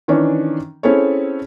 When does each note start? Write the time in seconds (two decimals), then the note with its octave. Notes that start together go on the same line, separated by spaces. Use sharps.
0.08 D#3 E3 C#4 D4
0.83 C4 C#4 E4 G#4 A4 C#5